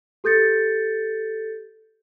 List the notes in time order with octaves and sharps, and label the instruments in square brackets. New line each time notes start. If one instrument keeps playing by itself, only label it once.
[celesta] G4 A4 G6 A6 C#7